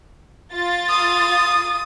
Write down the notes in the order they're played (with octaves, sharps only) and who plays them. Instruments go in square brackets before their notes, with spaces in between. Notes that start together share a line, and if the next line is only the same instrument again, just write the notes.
[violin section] F4 A6
[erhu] D#6